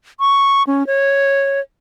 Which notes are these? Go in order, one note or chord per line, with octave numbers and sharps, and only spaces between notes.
C#6
C#4
C#5